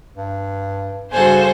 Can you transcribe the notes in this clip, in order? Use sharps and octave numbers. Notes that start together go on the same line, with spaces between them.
G2
G2 C#3 F#4 A4 C5 G#5